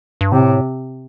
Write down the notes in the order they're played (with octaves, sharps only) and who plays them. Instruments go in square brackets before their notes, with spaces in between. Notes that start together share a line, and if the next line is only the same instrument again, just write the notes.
[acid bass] G2
[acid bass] A2 [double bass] C3